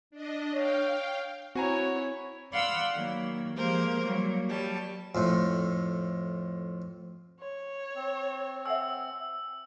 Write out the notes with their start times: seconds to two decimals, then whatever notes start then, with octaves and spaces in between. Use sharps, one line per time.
0.11 D4 D#5
0.54 C#5 F5 G5
1.55 C4 E4 F#4 C#5 G#5 A#5
2.51 D5 F5 F#5 B5 C6 E6
2.91 D#3 F#3 A#3
3.56 F3 G#3 A#3 G4 A#4 C5
4.03 F#3 G3 A#3
4.47 F#3 G3 A5
5.15 F2 A2
7.40 C#5
7.95 C4
8.66 E5 F#5 G#5 E6